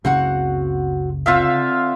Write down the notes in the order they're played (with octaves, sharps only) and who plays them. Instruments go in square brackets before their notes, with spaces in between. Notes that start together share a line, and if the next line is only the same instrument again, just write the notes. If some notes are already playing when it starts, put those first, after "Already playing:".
[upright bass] F#1 C#2 [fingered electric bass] C#3 [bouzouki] C4 F#4 F#5
[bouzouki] D3 C4 [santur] F4 E5 F5